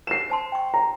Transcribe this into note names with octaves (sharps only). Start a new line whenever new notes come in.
C7 E7
C5 A5 C6
G5 C#6
A#5